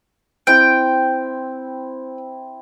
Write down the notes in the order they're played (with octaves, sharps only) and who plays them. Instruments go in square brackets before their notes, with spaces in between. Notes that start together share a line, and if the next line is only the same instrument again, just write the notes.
[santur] C4 E4 [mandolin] G5